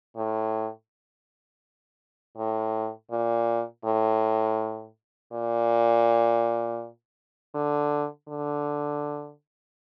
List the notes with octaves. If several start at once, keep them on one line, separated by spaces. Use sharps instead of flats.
A2
A2
A#2
A2
A#2
D3
D3